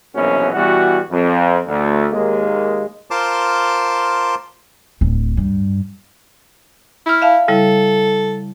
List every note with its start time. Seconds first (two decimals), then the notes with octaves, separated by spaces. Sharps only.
0.14 A#1 F#2 B2 E3 C#4 F#4
0.53 B2 E3 G3 F#4
1.11 F2
1.67 D2
2.12 D#2 G#3 A#3
3.11 F4 A#4 C5 A5 C6 D6
5.01 D1
5.37 G2
7.06 E4 E6 F6
7.22 E5 F5 A5
7.48 C#3 G3 E4 A4